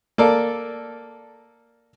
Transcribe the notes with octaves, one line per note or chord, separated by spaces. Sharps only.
A#3 A4 D5